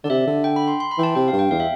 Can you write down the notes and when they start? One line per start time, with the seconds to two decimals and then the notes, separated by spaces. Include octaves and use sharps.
0.04 D3 D5
0.09 C3 E5
0.27 D3
0.44 G5
0.56 B5
0.68 C6
0.80 C6
0.91 B5
0.98 E3 G5
1.03 A5
1.15 C3 G5
1.28 G2 F5
1.39 G5
1.51 E2 F5
1.60 E5